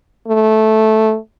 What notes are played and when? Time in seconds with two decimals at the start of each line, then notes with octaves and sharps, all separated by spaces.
0.28 A3